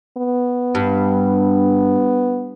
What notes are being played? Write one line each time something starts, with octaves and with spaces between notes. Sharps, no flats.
B3
G2